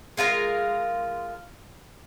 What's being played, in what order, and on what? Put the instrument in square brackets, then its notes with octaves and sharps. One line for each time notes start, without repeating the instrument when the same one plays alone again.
[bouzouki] G#3 F4 A#4 F5